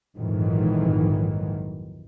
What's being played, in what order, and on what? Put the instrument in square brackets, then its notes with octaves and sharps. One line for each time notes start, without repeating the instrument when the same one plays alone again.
[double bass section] A#1 F2 G#2 D#3 E3 F#3